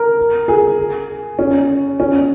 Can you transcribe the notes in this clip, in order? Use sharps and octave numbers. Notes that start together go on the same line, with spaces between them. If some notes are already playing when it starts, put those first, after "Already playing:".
Already playing: A#4
G#4
C#4
C#4